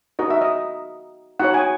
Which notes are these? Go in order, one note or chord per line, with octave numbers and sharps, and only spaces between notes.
D#4 F#4 A#4 D#5
E5
D#5
D#4 F#4 C#5 F#5
G#5